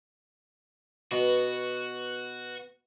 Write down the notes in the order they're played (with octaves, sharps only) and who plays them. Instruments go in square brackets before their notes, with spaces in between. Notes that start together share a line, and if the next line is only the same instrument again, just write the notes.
[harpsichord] B2 [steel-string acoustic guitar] B3 B4 [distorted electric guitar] F#4